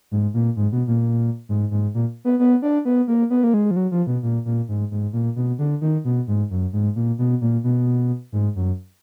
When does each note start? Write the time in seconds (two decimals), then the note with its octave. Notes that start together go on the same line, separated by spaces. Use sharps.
0.11 G#2
0.34 A#2
0.56 G#2
0.72 B2
0.87 A#2
1.49 G#2
1.71 G#2
1.95 A#2
2.25 B3
2.39 B3
2.62 D4
2.85 B3
3.08 A#3
3.30 B3
3.44 A#3
3.54 G#3
3.71 F3
3.76 F#3
3.92 F3
4.07 B2
4.23 A#2
4.45 A#2
4.68 G#2
4.91 G#2
5.13 A#2
5.36 B2
5.59 D3
5.81 D#3
6.05 B2
6.28 G#2
6.51 F#2
6.73 G#2
6.96 A#2
7.19 B2
7.41 A#2
7.64 B2
8.32 G#2
8.56 F#2